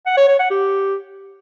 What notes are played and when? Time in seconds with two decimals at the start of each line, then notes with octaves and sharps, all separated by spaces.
0.06 F#5
0.17 C#5
0.28 C#5
0.39 F#5
0.50 G4